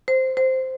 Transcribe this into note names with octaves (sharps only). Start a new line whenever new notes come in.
C5
C5